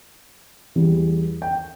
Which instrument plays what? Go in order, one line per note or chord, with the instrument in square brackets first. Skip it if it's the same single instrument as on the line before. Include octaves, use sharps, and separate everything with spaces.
[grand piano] E2 E3 G3
G5